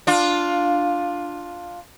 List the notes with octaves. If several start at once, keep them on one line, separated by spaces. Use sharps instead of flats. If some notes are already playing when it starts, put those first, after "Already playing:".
D4 F4